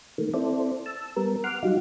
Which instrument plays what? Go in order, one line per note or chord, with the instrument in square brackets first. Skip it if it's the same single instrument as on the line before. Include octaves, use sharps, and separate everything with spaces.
[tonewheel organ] D#3 A3 A#3
C4 E4 A4 C5 D5
A5 E6
G3 B3 A#4
F#5 C6 D6 F6
F#3 G3 D#4 F4 F#4